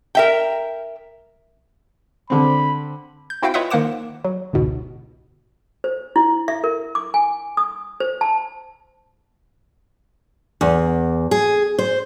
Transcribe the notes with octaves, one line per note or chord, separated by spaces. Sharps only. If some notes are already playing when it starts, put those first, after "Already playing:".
A#4 E5 G5
D3 C4 B5
G6
C4 E4 F#4 F5 G5
F4 B4 C#5 D#5 E5 F#5
D#3 A#3 C5 F#5 D6 E7
F#3
G1 C#2 G#2 B2
C5
E4
E5
A#4
D6
G#5
D#6
C5
A5
E2
G#4
C5